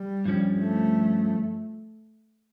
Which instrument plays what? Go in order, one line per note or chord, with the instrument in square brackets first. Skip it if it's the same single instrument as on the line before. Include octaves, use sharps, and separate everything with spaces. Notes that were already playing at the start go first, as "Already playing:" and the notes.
Already playing: [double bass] G3
[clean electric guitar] G2 F3 C#4
[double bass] A3